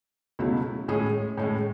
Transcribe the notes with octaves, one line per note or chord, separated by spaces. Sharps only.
C#2 B2 F#3 A3 E4
A2 G#3 C#4 G#4
A2 G#3 C#4